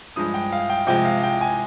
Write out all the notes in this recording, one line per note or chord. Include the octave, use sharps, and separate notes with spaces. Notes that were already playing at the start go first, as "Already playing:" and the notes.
G2 F3 G#3 D#6
G5
F5
G5
C3 F3 G#3 G5
F5
G5
G#5